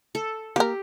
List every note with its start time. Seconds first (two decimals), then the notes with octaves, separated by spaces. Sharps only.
0.15 A4
0.56 A#3 G4 A#4